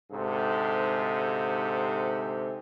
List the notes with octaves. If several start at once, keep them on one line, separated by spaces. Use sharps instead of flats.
D2 G#2 C3 A4